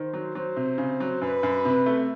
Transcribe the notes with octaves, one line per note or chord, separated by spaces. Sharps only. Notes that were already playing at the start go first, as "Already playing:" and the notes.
Already playing: D#3 C5
F#3
F#3 C5
C3
C#3
F#3
F#2 B4
F#2
C3
A3